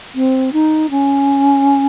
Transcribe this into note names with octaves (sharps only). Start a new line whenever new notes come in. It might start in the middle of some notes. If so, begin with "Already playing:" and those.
C4
D#4
C#4